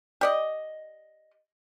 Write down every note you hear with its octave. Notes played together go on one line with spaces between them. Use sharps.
G4 D5 D#5